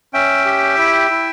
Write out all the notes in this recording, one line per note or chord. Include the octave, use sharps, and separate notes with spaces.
C#4 E5 G5
G4
E4
E4